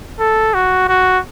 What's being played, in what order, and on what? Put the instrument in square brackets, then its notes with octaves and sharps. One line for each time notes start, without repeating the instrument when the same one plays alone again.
[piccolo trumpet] A4
F#4
F#4